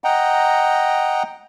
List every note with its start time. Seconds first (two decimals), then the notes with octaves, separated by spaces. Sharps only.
0.04 D#5 F#5 G5 A#5